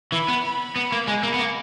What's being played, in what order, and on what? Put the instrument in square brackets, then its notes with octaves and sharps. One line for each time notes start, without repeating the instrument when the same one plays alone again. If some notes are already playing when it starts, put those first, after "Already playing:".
[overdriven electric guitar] E3 [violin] B5
[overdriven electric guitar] B3
[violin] B5
[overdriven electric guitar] B3
A#3
G#3
A#3
B3
A#3